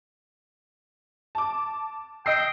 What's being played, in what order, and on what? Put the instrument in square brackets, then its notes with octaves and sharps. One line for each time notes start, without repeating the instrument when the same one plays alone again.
[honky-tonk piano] A5 D6
[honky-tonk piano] D#5 E6 C7 [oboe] G5